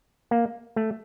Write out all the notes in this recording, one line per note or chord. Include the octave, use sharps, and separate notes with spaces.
A#3
A3